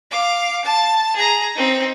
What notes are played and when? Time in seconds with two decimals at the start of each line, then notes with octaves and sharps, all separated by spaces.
0.11 F5 D6
0.64 A5
1.16 G#4 A#5
1.55 C4 D#4